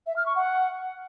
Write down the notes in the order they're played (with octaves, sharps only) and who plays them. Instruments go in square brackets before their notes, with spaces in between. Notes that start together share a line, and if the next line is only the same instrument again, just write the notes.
[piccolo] E5
F6
C#6
F#5